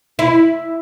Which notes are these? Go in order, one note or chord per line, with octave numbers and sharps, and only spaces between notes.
E4